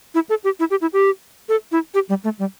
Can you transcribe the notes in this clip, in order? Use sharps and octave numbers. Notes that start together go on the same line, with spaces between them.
E4
A4
G4
E4
G4
E4
G4
A4
E4
G4
G3
A3
G3